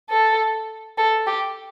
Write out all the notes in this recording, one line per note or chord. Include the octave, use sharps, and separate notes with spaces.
A4
A4
G4